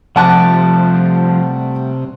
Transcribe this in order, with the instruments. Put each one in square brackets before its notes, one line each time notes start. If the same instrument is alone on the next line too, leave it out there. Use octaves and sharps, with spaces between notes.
[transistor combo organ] C3 [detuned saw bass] F3 [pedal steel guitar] G3 A3 D5 [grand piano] F#5 A5 F#6